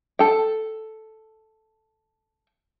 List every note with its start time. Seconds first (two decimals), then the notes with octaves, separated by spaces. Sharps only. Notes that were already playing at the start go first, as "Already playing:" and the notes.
0.19 A4 G5